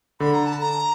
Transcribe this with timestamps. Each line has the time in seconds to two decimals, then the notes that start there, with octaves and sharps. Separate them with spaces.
0.20 D3 B5
0.34 A#5
0.46 A5
0.60 A#5